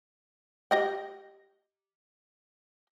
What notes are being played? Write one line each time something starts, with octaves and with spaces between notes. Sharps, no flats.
G4 D#5 G5